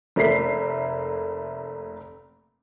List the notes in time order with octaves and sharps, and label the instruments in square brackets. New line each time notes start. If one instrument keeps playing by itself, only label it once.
[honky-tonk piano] F1 A3 A#3 B6 C7